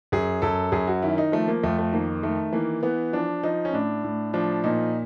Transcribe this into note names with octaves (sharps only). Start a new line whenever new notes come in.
F#2 G#4
F#2 A4
F#2 G#4
F#4
D#3 E4
D#4
F3 A3
A#3
F2 A3
A3
D#3 A#3
D#3 A3
E3 A#3
E3 B3
F3 D4
F3 D#4
C#4
A2 D4
A2
F3 D4
A#2 D#4